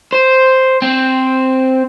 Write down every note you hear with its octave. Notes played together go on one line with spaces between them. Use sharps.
C5
C4